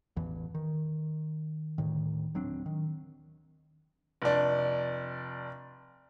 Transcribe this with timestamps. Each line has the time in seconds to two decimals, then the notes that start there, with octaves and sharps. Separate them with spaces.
0.16 A1 E2 E3
0.55 D#3
1.78 D2 A2 D#3
2.34 D#1 F#3 C4 D4
2.66 D#3
4.22 F1 D4